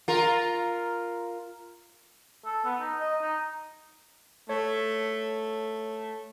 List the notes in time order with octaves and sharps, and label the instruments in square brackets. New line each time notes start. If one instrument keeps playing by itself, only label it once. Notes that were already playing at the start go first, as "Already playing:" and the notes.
[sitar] F4 A#4
[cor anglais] A4
B3
D#4
D#5
D#4
[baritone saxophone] A3 [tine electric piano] C#5